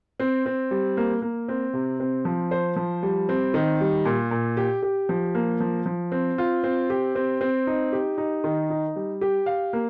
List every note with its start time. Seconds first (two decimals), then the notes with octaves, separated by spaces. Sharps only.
0.20 C4
0.46 C4
0.71 G3
0.97 A#3
1.22 A#3
1.48 C4
1.73 C3
2.00 C4
2.25 F3
2.51 C5
2.76 F3
3.03 G3
3.29 C4
3.54 D#3
3.81 G3
4.05 A#2
4.31 A#2
4.57 G4
4.82 G4
5.09 F3
5.35 A#3
5.60 F3
5.86 F3
6.12 C4
6.38 F4
6.63 C4
6.90 G4
7.15 C4
7.41 C4
7.67 D#4
7.93 G4
8.18 D#4
8.44 D#3
8.70 D#4
8.96 G3
9.21 G4
9.46 F5
9.73 A#3